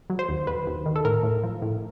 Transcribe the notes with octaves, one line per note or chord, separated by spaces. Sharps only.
F#3
C5
D#2
D#2 B4
D#2
D#3
A4
A2 A#4
A2
F3
A2